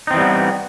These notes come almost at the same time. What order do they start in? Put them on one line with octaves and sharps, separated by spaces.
D#4 C4 E3 G3 B3